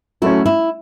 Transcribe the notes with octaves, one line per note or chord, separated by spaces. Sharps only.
F#3 A3 C#4 E4
E4